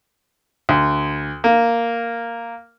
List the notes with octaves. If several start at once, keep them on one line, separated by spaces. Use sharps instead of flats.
D2
A#3